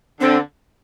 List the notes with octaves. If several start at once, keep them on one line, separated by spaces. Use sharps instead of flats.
D3 C4